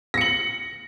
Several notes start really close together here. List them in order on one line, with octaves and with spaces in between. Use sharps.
A#6 C#7 F#7